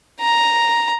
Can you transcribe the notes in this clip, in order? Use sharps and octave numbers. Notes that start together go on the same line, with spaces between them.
A#5